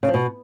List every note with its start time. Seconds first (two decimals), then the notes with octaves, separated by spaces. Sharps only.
0.03 C#3
0.08 F3
0.14 B2